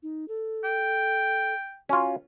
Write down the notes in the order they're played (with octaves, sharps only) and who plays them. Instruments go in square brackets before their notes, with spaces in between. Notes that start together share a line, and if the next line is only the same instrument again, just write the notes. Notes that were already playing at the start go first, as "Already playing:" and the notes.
[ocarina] D#4
A4
[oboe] G5
[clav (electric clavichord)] C#4 F4 [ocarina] F#4